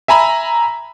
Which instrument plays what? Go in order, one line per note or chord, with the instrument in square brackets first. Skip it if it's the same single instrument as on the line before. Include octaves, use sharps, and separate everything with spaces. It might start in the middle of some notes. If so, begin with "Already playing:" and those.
[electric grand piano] E5 G#5 A#5 B5